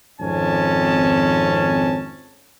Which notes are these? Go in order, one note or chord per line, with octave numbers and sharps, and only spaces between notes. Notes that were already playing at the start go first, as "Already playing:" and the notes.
G#1 F2 C#4 G#5 A5